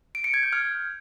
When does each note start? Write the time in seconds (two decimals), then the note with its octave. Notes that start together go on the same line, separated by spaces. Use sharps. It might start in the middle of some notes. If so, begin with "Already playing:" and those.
0.15 D7
0.24 C#7
0.34 G#6
0.43 G6
0.53 F6